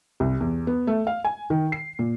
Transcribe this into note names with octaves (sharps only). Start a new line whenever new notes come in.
C2
E2
B3
A3
F5
G#5
D#3
C7
A#2